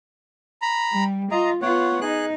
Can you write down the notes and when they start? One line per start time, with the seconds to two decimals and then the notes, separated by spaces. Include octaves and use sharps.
0.62 A#5 B5
0.92 G3
1.31 F4 D#5 A#5
1.62 B3 F4 C#5 F#5
2.01 D#4 G#4 F#6